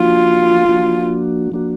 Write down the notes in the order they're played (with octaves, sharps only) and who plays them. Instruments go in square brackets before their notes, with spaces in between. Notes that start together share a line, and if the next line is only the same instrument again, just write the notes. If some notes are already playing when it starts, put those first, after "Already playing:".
Already playing: [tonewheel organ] F3 A#3 D4 F#4 [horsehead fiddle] F4
[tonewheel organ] F3 A#3 D4 F#4
F3 A#3 D4 F#4